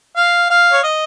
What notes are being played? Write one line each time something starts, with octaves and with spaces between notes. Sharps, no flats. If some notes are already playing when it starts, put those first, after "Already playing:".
F5
F5
C#5
D#5